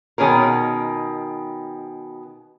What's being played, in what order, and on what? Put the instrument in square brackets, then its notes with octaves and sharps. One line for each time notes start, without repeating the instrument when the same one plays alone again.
[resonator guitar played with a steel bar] B2 D#3 C#4 G#4 A#4